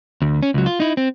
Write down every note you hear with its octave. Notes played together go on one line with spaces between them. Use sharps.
D2
C#4
C#2 F#3
F4
D#4 E4
C4